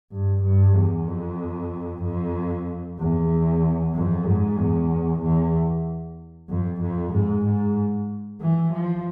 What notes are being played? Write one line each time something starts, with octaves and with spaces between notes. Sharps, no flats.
G2
G2
E2
F2
F2
E2
F2
G#2
E2
E2
F2
F2
G#2
G#2
E3
F3